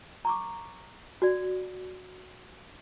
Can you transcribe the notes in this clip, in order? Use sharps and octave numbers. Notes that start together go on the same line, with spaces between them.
A#5 C#6 D6
F#4 D5